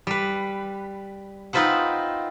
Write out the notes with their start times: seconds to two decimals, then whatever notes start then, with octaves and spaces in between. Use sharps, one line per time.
0.07 G3 B4
1.53 C4 D#4 F4 B4 C5 F#5